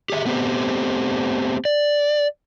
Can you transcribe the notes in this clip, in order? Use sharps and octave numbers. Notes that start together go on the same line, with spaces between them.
G4 G#4 C#5 E5
A3 B3 C4 G4
D5